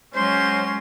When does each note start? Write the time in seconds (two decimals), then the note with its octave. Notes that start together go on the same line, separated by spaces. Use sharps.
0.15 F#3 G#3 C#4 C5 C6